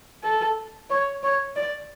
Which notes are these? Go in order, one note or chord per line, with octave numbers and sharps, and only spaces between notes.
A4
C#5
C#5
D5